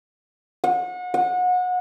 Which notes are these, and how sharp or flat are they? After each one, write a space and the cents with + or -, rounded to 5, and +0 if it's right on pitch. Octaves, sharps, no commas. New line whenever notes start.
F#5 -35
F#5 -30